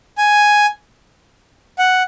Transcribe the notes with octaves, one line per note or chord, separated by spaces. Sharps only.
G#5
F#5